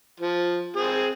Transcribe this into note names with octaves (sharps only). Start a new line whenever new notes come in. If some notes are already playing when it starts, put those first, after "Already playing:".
F3
C4 G#4